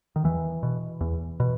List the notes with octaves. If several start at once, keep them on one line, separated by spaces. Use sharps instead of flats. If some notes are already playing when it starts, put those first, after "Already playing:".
D#3
E2 E3
B2
E2
B2